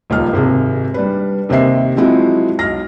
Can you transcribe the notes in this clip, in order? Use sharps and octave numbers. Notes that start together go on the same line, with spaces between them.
D#1 C#2 D#3 F6
G#1 C3 G#4
G3 D4 B4
D#2 C3 D#3 C5 E5 C7
F3 F#3 G#3 C4 E4 F#4
B1 F6 A#6